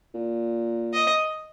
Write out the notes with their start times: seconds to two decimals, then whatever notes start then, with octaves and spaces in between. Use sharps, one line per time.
0.14 A#2
0.93 D#5